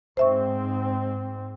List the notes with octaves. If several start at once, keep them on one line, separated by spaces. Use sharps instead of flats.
G#2 C4 C5 E5 C#6